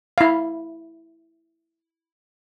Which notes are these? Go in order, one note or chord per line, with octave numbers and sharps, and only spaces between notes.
E4 F5